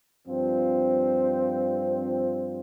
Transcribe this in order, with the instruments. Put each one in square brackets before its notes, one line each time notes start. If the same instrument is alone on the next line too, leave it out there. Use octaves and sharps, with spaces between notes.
[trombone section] G2 F3 C4 F4